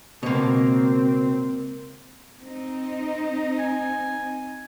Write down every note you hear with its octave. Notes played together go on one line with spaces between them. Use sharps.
C#2 B2 A#3 C4 C#5
C4 D#4
G#5